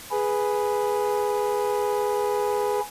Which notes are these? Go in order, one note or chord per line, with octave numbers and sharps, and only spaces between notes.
G#4 B4